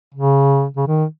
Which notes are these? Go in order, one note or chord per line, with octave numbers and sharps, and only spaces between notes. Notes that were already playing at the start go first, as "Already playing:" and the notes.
C#3
C#3
D#3